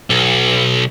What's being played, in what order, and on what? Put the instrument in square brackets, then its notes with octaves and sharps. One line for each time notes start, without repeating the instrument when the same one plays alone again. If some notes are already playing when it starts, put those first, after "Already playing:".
[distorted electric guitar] B1